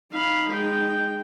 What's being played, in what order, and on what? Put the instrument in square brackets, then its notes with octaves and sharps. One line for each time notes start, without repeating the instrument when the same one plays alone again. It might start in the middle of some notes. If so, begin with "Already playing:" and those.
[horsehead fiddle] D#4 [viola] F5 B5
[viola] G#3 G5